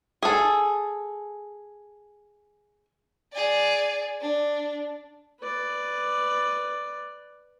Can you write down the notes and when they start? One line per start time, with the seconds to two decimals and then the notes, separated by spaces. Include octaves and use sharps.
0.23 G#4 A4
3.33 G#4 D5
4.21 D4
5.40 B4 D5